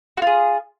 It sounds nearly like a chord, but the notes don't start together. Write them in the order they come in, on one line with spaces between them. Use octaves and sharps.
F#4 F4 G#4